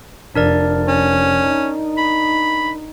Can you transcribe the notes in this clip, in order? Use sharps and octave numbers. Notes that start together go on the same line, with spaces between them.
F1 D4 A#4 D5
C#4
D#4
B5